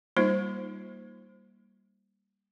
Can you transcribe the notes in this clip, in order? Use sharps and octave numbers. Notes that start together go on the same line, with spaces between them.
G3 A#3 D#4 F4 C5